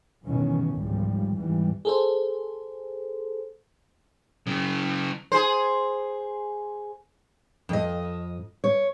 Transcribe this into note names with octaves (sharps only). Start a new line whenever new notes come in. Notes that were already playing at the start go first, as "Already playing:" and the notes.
E2 G2 B2 D#3 C#4
G#1 C#2 G#2 F3 G3
E2 G#2 E3 G3
G#4 A4 C5
C#3 F#3
G#4 C5
F2 D#5
C#5